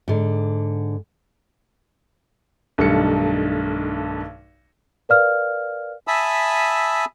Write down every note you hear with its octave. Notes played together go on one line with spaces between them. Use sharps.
G#2 D3
B1 G2 D#3 A3 A5 C#7
A#4 B4 D5 F5 F6
E5 G#5 A5 B5 D#6 E6